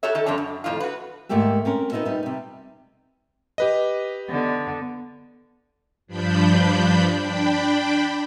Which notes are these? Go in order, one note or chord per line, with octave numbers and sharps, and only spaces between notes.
F#4 G4 A4 C#5 E5
D#3 A4
F2 G3 D4 C#5
F#2
F2 A2 D#3 F4
F#4 B4
G#2 D#3 A3 A#3 G4 E5
C4 C#4 A#4
B3 D#4 A#4 D#5 E5
G3 D#4
C3 G3
G4 B4 D#5
D3 B3
G2 F3 D4 B5 G6
D4 G5 B5